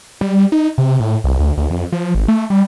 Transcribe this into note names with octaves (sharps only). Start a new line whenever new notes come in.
G3
D#4
C3
A2
C2
D2
D2
F2
F3
G#1
A3
G3